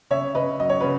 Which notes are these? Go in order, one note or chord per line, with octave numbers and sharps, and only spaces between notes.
C#3 C#5 E5
C#3 B4 D#5
F#3 D#5
C#5
C#3 B4